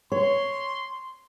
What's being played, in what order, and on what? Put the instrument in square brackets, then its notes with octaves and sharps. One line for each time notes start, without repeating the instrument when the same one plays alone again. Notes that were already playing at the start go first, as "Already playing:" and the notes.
[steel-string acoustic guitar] C#5 [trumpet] C6